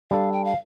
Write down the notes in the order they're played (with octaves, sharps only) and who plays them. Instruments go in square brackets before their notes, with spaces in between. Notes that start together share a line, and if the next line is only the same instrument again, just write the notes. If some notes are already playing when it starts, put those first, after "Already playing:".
[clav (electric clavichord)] G3 D4 A4 [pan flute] F5
[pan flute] G5
F5